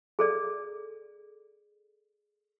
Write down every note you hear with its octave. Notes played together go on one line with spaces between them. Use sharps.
G#4 A4 D5